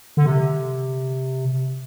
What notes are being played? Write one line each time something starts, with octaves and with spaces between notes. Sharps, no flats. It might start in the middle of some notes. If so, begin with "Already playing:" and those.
D3
C3